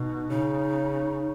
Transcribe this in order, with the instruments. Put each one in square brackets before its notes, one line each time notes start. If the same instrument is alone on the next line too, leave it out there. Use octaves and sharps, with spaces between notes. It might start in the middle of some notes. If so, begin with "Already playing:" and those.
Already playing: [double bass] B2 [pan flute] D#4
[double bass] C#3 [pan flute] D#4